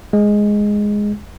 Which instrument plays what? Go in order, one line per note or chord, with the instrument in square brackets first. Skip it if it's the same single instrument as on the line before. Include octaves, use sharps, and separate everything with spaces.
[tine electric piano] G#3